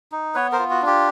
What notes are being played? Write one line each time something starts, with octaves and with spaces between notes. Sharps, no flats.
D#4
B3 B4 C#5
A#4 C5
F4
F#4
D4 G4